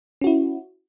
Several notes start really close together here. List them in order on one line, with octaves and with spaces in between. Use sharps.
C#4 F#4 E4